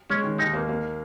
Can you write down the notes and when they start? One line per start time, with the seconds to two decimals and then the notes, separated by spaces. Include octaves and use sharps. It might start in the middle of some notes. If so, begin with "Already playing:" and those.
0.10 G#3 C#4
0.24 D#3
0.38 D#2 D#4
0.54 A#3
0.69 A#3